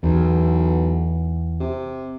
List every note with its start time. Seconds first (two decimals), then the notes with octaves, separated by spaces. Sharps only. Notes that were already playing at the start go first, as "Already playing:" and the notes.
0.03 B1 E2
1.60 C3